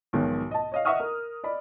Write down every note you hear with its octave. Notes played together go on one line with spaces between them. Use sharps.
B1 G#2 B2 D#3 F3
D#5 A5
C#5 D#5 F5
D#5 E5 F#5 C#6 D#6 F6
A#4
D5 D#5 B5